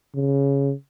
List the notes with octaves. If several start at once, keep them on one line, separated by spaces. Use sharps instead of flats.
C#3